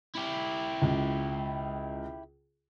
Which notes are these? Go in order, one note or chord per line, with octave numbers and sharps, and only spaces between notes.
E4 G4
C#2